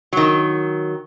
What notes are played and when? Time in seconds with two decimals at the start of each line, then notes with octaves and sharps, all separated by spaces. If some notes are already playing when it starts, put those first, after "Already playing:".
0.13 D#3 F#3